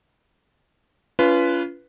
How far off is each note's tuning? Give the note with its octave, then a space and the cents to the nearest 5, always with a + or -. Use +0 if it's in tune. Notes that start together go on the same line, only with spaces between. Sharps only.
C#4 +30 F4 -25 B4 +0